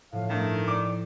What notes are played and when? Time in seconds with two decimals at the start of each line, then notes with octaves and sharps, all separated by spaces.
0.12 A2 F3 B3 F5
0.30 G2 D#3 A3 A6
0.68 D5 D6 C#7 E7